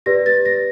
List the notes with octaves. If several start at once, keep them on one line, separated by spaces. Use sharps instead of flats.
G4 B4 D5 A#6
A6
A#6